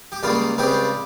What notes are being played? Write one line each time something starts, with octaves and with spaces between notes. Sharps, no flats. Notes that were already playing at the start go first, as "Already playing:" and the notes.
G4
C#2 C#3 G3 A#3 F4
C#2 C#3 G3 C4 G4